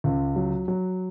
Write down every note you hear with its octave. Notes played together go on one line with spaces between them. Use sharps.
C#2
F#3
F#3